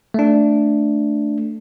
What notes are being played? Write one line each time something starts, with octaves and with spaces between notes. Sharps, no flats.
A3 D4